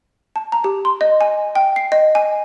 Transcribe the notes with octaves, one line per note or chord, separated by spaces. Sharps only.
A5
A#5
G4
C6
D#5
G#5
G5
C7
D#5
G#5